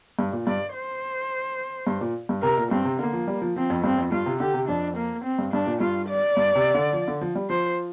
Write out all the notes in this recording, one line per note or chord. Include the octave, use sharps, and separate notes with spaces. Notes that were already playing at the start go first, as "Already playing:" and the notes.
G2
A#2
G2 D5
C5
G2
A#2
G2
C3 A#4
A#2
G2 C4
C3
D3 A#3
F3
G3
F3
F3 C4
F2
G2 C4
F2
G2 F4
C3
D3 G4
C3
F2 D4
A#3
C4
G2
G2 D4
A#2
G2 F4
D5
G2
C3
D3
F3
D3
F3
G3
F3 C5